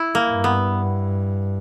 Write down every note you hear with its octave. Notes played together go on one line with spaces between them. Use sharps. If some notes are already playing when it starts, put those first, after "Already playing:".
Already playing: E4
A#3
G2
B3